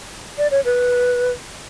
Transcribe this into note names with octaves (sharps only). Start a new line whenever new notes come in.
D5
C#5
B4